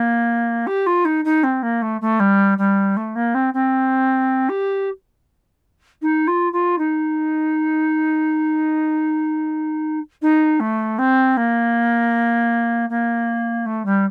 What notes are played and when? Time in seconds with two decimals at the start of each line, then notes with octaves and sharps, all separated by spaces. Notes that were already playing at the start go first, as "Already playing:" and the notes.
Already playing: A#3
0.66 G4
0.86 F4
1.05 D#4
1.24 D#4
1.43 C4
1.62 A#3
1.82 A3
2.01 A3
2.19 G3
2.58 G3
2.96 A3
3.15 A#3
3.34 C4
3.53 C4
4.49 G4
6.02 D#4
6.27 F4
6.52 F4
6.78 D#4
10.22 D#4
10.60 A3
10.98 C4
11.37 A#3
12.89 A#3
13.65 A3
13.85 G3